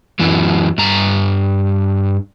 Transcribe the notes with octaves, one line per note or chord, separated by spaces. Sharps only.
F#2 E3 F#3
G2 A#5